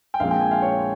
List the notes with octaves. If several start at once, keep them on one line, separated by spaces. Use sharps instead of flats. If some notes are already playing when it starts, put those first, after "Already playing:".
G5
A#1 A#2 F3 G#3 C4 F5
G5
G#5
F5
C#5